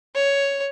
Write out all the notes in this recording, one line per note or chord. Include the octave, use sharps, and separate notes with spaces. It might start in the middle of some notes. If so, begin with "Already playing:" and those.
C#5